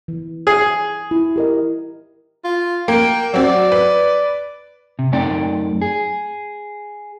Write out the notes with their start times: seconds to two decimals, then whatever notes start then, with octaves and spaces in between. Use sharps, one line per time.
0.08 E3
0.47 G#4
1.11 E4
1.36 G4 A#4 D#5
2.45 F4
2.88 A#3 G5
3.34 F#3 C4 F#4 D5
3.72 B4
4.99 C3
5.12 F#2 A3 C4 D#4 D5 G5
5.82 G#4